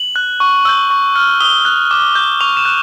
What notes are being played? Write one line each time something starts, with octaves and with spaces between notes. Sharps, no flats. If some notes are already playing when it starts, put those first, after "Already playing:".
Already playing: F#7
F#6
C#6
E6 G6
C#6
F6
D#6 G7
F#6
D6
G6
C#6 F7
E7
F#6